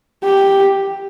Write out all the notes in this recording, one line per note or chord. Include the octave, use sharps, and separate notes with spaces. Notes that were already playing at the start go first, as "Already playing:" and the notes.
G4